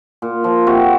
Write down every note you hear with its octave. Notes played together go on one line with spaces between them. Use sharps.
A#2
F3
C3 F#4